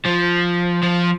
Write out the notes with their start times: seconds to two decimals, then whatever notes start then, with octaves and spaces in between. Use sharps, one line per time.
0.05 F3
0.83 F3